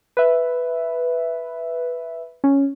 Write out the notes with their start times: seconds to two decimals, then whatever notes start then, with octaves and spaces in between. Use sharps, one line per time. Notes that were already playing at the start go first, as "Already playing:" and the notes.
0.17 B4 E5
2.44 C#4